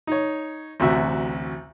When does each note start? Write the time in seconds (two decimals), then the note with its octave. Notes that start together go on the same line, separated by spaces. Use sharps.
0.07 D#4 C#5
0.80 A1 D2 C3 F#4 E5